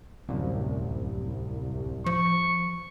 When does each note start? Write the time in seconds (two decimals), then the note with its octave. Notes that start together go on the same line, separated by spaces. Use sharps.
0.29 D1 C2 F#2
2.06 F3 C#6